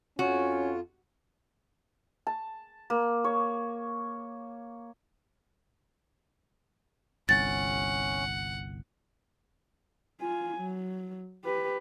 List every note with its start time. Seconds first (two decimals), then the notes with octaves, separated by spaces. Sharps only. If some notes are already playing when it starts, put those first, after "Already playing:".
0.19 F2 C#4 F4 F#4 C#5
2.27 A5
2.90 A#3
3.24 C#5
7.29 G1 C2 C#4 F#5 A6
10.21 F4 G#5
10.57 F#3
11.45 G4 B4